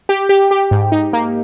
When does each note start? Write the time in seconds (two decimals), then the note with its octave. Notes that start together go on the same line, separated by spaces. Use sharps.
0.09 G4
0.29 G4
0.51 G4
0.71 G#2
0.92 D#4
1.13 A#3